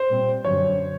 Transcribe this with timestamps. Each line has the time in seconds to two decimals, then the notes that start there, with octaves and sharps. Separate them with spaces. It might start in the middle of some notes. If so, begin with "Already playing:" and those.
Already playing: C5
0.09 A#2 G3 C4
0.45 F#2 D3 F#3 C#5